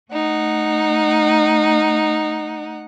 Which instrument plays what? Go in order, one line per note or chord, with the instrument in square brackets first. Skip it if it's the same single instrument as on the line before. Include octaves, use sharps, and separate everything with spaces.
[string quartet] A3 D#4 F#5